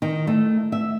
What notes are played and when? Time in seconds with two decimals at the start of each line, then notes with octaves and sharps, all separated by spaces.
0.02 D#3
0.27 A3
0.72 E5